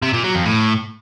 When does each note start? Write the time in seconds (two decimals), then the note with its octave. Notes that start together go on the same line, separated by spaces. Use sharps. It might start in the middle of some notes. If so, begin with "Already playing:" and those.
0.02 C3
0.13 A#2
0.24 F#3
0.35 F2
0.45 A2